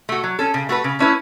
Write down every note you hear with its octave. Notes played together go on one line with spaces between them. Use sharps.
A3 F#4
F#3
C#4 A4
C#3
A3 F#4 B4
C#3
A3 C#4 E4 B4